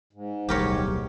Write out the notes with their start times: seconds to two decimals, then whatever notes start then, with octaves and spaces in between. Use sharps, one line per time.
0.13 G#2
0.49 D1 B1 A2 G3 G4 A#4 C#5